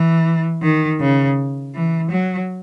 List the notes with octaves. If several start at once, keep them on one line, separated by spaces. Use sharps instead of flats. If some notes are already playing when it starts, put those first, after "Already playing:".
Already playing: E3
D#3
C#3
E3
F#3